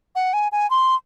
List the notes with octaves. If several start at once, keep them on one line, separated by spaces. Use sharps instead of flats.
F#5
G#5
G#5
C6